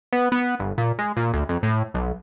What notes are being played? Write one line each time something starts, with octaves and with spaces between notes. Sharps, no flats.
B3
B3
G1
A#2
G#3
A#2
D2
F2
A2
B1